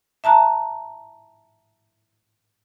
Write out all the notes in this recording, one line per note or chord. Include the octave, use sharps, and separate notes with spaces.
E5 A5 A#5 F#6